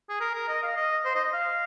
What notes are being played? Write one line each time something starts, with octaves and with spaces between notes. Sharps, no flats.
G#4
A#4
A#4
D#5
F5
D#5
C5
D#5
F5